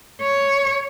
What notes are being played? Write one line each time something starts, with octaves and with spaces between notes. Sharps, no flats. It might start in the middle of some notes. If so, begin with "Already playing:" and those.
C#5